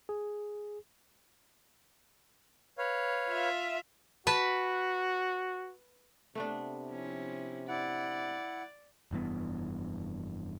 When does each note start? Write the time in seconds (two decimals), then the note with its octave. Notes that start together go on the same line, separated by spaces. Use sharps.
0.09 G#4
2.78 B4 C#5 F5
3.29 F4 E5
4.27 F#4 B4 A5
6.35 C3 A3 B3 D4
6.91 F3 C#4 E4
7.68 E4 D5 F#5
9.11 F1 G2 E3 B3